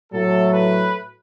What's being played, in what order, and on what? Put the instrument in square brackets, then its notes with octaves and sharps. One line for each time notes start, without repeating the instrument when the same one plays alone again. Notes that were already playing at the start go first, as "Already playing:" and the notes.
[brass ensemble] A2 F#3 A3 A4
B4